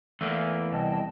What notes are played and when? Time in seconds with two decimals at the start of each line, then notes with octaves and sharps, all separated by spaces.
0.21 E2 A3 A#3
0.73 C2 D#5 G5 A5